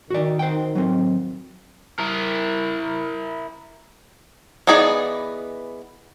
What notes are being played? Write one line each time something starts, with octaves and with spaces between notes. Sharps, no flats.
D#3 F#4 D5
C5 F#5 G5
F#3 C4
E4 A#4
E3 B3 D#4 G#4 D5